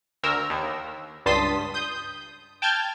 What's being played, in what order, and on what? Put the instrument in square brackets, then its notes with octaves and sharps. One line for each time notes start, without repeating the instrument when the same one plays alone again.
[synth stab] D2 A#4 E6
D#2
C#2 G2 A5 C6 D#6 B6
D#6 G6
G5 A5 F6 G6 G#6